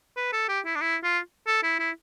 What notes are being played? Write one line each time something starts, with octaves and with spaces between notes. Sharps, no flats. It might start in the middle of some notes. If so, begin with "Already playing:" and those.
B4
A4
G4
E4
D4
E4
F4
A4
E4
E4